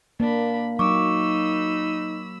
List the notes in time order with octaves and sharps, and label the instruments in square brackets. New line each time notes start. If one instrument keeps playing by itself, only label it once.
[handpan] A#3 [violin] D4 B5
[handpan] F#3 [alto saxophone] D#4 [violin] B5 E6 [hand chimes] C#6 D6